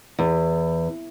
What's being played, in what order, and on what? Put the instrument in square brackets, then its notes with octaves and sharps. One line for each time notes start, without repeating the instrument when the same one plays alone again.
[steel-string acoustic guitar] E2